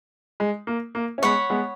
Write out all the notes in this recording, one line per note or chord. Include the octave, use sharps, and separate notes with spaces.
G#3
A#3
A#3
C#4
G#3 B3 C#5 F#5 B5
G#3 B3